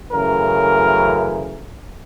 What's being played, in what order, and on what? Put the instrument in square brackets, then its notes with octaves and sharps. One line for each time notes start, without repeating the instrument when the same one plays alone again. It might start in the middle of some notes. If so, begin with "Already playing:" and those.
[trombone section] F#2 C#3 E3 A3 A#4